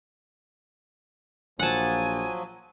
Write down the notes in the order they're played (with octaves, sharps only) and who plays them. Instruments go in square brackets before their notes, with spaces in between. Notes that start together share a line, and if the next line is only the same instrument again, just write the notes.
[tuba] A#1 [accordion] F3 F#3 [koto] F#5 A5 [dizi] G#5